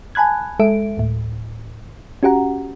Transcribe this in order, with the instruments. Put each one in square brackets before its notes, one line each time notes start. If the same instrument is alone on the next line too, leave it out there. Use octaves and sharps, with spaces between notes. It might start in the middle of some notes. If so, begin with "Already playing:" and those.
[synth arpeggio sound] G#5 A5 B5 F#6 G#6
G#3 A4 E5 D7
D2 A2
C#4 F#4 G4 F#5 A#5